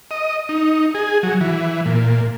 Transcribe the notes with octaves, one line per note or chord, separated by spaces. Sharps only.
D#5
D#4
G#4
F#3
E3
A#2